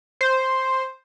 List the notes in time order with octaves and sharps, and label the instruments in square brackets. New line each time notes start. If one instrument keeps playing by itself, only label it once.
[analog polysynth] C5